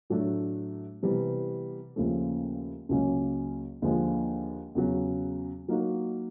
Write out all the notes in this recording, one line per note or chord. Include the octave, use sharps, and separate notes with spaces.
A2 F#3 A3 D4
C3 E3 G3 B3
D#2 C#3 F3 A3
C#2 C#3 F#3 A#3 C#4
D#2 D3 F3 G#3
E2 C#3 F#3
F#3 A#3 D#4 F#4